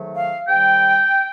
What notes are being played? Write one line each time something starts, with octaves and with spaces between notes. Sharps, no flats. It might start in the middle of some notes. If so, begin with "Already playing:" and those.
Already playing: G#2 D#3 F#3 A3
F5
G#2 D#3 G3 G5